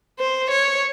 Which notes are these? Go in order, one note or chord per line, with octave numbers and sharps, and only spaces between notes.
C5
C#5